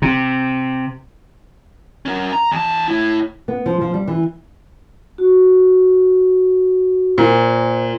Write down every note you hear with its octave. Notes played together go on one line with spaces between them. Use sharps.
C3
C#4 A#4
A#5
E2 A5
A2 E4
B3
F3
F3
G3
E3
F#4
A#2 C5